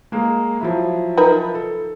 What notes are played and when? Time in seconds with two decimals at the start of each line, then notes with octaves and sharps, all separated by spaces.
0.12 G#3 A#3
0.61 F3 F#3 E4
1.17 D#4 A#4 B4
1.55 A4